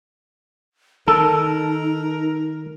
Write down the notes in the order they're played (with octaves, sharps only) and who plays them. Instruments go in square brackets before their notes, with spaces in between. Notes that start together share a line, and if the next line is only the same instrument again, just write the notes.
[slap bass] D#3 [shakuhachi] D#4 [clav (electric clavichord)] A4 [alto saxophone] A#4